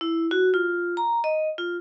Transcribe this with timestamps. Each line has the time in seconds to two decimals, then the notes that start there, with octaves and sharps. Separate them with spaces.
0.01 E4
0.31 F#4
0.54 F4
0.97 A#5
1.24 D#5
1.58 F4